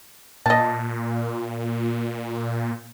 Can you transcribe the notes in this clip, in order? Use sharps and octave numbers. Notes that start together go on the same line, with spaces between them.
A#2 D#5 A5